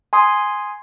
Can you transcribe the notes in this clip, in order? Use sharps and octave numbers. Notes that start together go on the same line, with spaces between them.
G#5 C6 D#6